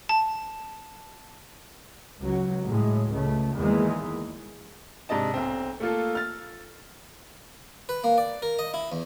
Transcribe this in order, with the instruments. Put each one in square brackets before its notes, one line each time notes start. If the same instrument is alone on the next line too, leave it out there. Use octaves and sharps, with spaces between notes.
[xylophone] A5
[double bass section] C#2 F#3
A2 G#3
C#2 A3
E2 D#3 E3 G#3 A#3
[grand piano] G#2 C3 D4 D#5 A5
B1 C4
A3 A#3 F4 A4
F6 A6
[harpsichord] B4
A#3
D5
A#4
D#5
E4
E2